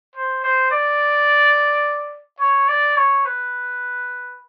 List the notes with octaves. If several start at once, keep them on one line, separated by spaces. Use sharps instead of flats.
C5
C5
D5
C#5
D5
C#5
B4